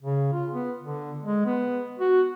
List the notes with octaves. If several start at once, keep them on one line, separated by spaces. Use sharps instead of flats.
C#3
F4
B3
D3
G#3
B3
F#4